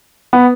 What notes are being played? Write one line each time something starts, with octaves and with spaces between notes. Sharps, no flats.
B3